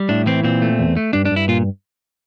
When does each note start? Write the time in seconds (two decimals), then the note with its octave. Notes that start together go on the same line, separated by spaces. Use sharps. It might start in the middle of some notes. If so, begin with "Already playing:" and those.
Already playing: G3
0.09 A2 D4
0.26 E3 C4
0.44 A#2 C4
0.62 A3
0.79 E2
0.97 A3
1.13 G2 D4
1.25 D4
1.31 G2 E4
1.48 A#2 F4